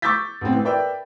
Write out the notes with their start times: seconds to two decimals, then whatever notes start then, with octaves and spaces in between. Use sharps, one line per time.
0.02 C#6 D6 E6 G6 A6 B6
0.41 A1 C4
0.53 E3
0.65 A#4 B4 D5 E5 G5